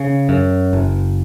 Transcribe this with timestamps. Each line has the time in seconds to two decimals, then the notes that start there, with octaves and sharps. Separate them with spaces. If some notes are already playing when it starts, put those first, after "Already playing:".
Already playing: C#3
0.29 F#2
0.73 F#1